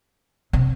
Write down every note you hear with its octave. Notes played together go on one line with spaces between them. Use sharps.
C3